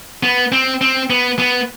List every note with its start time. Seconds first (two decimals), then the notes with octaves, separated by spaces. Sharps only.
0.23 B3
0.52 C4
0.81 C4
1.10 B3
1.39 B3